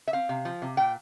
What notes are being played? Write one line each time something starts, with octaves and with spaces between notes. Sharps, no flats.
E5
C4 F5
C3
F3
C3
A#2 G5